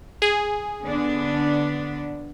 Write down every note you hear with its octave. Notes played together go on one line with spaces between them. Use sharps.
G#4
D3 B3 D4